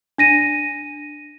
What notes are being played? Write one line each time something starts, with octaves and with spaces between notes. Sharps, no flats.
D4 A#6 D#7